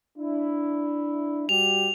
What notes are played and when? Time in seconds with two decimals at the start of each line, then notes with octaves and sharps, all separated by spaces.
0.18 D4 E4
1.49 G3 F#4 G4 F7